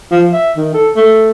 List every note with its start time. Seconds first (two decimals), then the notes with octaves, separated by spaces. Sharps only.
0.12 F3
0.33 E5
0.57 D#3
0.74 A4
0.96 A3